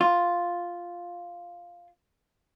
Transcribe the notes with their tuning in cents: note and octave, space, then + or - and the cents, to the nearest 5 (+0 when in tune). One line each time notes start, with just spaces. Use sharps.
F4 +0